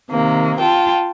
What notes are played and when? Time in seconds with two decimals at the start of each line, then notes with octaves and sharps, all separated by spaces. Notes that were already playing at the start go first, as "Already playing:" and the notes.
0.10 C3 D#3 A#3
0.60 F4 G5 A5